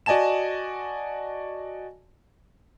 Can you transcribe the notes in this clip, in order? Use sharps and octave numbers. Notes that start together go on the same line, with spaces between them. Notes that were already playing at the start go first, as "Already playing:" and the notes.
F#4 D5 D#5 G#5 A5 E7